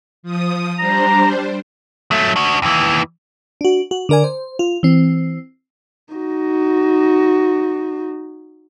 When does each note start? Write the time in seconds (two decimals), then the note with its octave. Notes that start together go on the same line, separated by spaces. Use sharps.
0.23 F3 D#6
0.78 G3 D4 C5 A#5
2.11 F#3 A3
2.36 D4 F#4
2.62 D#2 E3
3.61 D4 F#4
3.91 F#4
4.09 D3 D4 A#4 D5 G#5
4.24 C5
4.59 F4
4.83 E3 C4
6.14 D#4 F#4